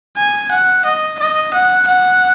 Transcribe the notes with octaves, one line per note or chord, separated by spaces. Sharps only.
G#5
F#5
D#5
D#5
F#5
F#5